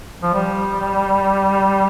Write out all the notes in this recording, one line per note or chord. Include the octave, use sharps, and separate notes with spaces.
F3
G3